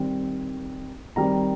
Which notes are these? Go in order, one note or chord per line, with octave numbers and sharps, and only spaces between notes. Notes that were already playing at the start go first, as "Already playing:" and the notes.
Already playing: D#3 G3 C4
D#3 G3 C4 A#5